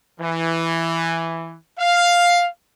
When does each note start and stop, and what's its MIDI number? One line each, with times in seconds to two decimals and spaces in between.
0.20 1.55 52
1.78 2.47 77